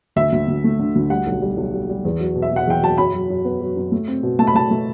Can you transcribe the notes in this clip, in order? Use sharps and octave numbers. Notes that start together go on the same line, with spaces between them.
D2 E5
D2
D2
A3
D3
D2
G3 F#5
B1
G3
B1
G3
G3
E2
F#3
B2
E5
B2
F#5
E2 G5
F#3 A5
F#2 B5
F#3
F#2
B3
F#3
F#2
A3
C4
B2
A3 A5
B5
A3 A5
A3